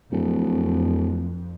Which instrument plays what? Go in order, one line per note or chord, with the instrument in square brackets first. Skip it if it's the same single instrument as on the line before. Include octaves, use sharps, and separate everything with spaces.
[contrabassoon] D1 [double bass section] F2